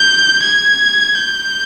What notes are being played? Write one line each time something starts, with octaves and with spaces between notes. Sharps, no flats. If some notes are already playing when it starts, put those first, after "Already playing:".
Already playing: G6
G#6
G6